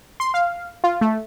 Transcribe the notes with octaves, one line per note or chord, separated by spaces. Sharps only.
C6
F5
F4
A3